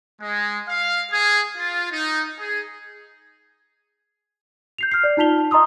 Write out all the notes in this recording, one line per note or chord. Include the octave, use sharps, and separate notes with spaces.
G#3
F5
G#4
F4
D#4
G#4
G6 C7 F7
F6 C7
D5
D#4 F4 A5 B6 F7 G7
A5
D#5 A#5 C6 D#6 E6